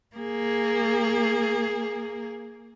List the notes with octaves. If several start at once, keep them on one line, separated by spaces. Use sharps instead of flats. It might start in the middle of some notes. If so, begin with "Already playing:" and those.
A#3 G#4